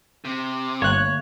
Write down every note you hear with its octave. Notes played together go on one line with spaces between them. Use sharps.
C3
G1 D3 A3 A#3 C#5 F#6